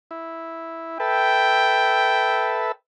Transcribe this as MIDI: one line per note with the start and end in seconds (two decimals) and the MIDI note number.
0.11 0.98 64
1.00 2.72 69
1.00 2.72 71
1.00 2.72 76
1.00 2.77 79